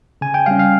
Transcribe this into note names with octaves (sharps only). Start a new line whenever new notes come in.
C#3 G#5
G5
G3 C#4 F5
F5